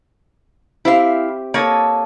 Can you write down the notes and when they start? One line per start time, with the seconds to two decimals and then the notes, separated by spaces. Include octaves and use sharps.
0.85 C4 E4 G4 E5 F5
1.54 A#3 A4 C#5 D#5 A5